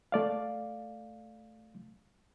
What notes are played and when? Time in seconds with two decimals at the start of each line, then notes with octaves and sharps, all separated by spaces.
0.12 A3 D5 F5